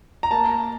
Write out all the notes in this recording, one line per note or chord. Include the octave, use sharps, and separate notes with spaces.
A#5
A#3 A5